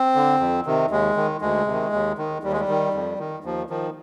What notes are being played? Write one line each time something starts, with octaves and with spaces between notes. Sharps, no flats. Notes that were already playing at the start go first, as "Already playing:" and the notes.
Already playing: C4
D3
F2
C3 D#3
D#2 G#3
D#3
D2 G#3
C3 D#3
D#2
D#3
D#2 G3
G#3
G3
D#3
F2
D#3
D#2 F3
D#3 F3